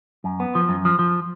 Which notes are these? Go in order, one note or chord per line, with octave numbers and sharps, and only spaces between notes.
F#2
B3
F3
F#2
F3
F3